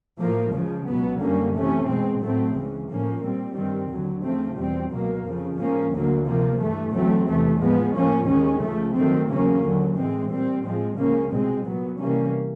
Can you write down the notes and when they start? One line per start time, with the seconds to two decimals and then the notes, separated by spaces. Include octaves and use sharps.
0.19 A2 F3 A#3
0.53 C#2 C#3 F3
0.86 C#2 B2 F#3 B3
1.20 F#2 D3 G3 A#3 C#4
1.54 C3 E3 A3 C#4
1.88 B2 G#3 C4
2.22 A2 F#3 A3 C4
2.55 C#2 C#3 E3
2.89 A2 F3 A#3 C#4
3.23 A#2 G3 C4
3.56 G2 D#3 G3 C4
3.90 D#2 D3 F#3
4.23 D2 C#3 F3 A3 C4
4.57 E2 B2 G3 C4
4.91 C#2 B2 F#3 A#3
5.24 F2 C#3 F3
5.59 G#2 F3 A#3 C#4
5.92 D2 D3 F#3 A#3
6.25 C3 F3 A#3
6.59 G2 E3 A3
6.92 E2 C#3 F#3 A3 C4
7.26 E2 C3 E3 A3
7.60 A2 F3 G#3 B3
7.94 A2 F3 A#3 C#4
8.28 D#2 D#3 G#3 C#4
8.61 C#2 C#3 F3 A3
8.94 G2 D#3 F#3 A3 C4
9.28 E2 C#3 F#3 A#3 C#4
9.61 D#2 D3 F#3
9.96 A2 E3 G#3 C4
10.29 A#2 G3 C4
10.63 A2 F3 G#3 C4
10.96 C#2 C#3 F3 A#3 C#4
11.30 C2 B2 G#3 C4
11.64 A#2 F#3 B3
11.98 C3 E3 G3 A#3 C#4